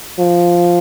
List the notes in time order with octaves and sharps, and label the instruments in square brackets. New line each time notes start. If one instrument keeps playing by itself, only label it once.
[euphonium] F3